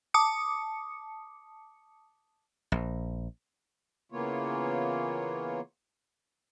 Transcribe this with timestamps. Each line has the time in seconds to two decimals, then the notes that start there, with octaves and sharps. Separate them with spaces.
0.14 A5 D6 D#6 C#7
2.72 A#1
4.12 C#3 E3 A#3 B3 F4 C#5